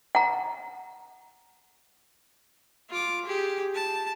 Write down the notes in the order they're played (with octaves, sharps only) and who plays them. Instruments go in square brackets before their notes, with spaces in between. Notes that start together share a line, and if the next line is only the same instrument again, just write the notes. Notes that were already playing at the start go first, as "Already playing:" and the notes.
[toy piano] F#5 A#5
[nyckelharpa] F4 D6
G4 G#4
A5